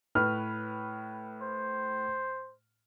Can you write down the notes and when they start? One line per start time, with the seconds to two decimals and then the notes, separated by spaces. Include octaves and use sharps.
0.15 A2 B4 F6
1.41 C5